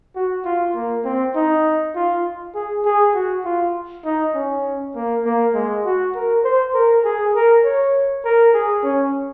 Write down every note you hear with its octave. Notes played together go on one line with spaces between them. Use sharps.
F#4
F4
A#3
C4
D#4
F4
G#4
G#4
F#4
F4
D#4
C#4
A#3
A#3
G#3
F#4
A#4
C5
A#4
G#4
A#4
C#5
A#4
G#4
C#4